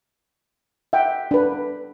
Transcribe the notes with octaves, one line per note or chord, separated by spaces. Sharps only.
E5 F#5 G5
D4 B4